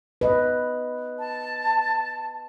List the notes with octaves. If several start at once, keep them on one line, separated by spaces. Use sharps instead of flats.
B4 D#5
A5